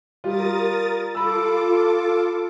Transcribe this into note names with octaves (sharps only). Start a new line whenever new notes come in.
G3 F4 A#4 D#6 A6
F4 A4 B5 D6 E6